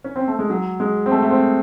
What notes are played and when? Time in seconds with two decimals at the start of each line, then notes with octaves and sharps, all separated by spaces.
0.04 C#4
0.16 C4
0.28 A3
0.39 G#3
0.50 F#3
0.80 G#3
1.06 C4
1.11 A3
1.22 A3
1.31 C4